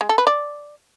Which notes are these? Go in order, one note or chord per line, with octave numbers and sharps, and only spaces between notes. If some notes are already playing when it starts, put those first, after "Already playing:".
G#3
A4
B4
D5